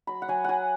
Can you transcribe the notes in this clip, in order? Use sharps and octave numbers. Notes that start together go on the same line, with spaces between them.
F#3 B5
F#5
F#3 G#5
F#3 F#5 G#5